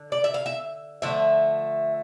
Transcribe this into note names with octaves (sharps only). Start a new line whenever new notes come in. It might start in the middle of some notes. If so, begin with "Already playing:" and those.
Already playing: D3
D5
E5
F5
E5
D3 F3 A3 E5